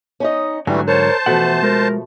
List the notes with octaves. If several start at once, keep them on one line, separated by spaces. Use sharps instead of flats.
C#4 D#4 D#5
G#2 D3 E3 F#3 G3 A3 G#5
A#4 C5 C#5 A5
B2 E3 F3 A3 E5 F#5
G#3 A#4